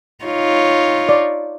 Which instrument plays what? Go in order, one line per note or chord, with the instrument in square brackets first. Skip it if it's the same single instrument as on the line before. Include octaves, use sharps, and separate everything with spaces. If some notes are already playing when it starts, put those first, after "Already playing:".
[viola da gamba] D#4 F4 C#5
[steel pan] D5